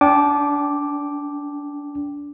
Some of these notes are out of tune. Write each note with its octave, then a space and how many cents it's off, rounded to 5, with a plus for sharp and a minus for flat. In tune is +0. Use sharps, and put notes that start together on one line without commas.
D4 -25 G5 +0 D6 +0